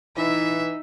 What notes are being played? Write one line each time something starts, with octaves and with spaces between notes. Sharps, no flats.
E3 D#4 E5